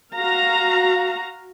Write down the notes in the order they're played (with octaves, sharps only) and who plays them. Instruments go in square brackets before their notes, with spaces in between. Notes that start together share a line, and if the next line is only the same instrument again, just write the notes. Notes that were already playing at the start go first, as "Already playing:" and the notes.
[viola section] F#4 F5 A#5